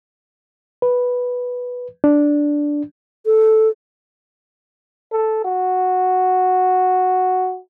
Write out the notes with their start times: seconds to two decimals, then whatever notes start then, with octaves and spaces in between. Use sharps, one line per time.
0.82 B4
2.04 D4
3.26 A4
5.12 A4
5.45 F#4